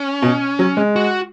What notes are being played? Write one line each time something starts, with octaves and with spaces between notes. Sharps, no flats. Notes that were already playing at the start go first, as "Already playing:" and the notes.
Already playing: C#4
B2
F#3
G#3
F#4